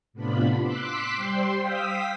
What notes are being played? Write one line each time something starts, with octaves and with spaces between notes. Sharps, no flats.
A2 C3 B3 D4 F4 B5
C6 D6 E6 F#6 B6
G3 C5 G5 C6
F5 G5 D#6 E6 B6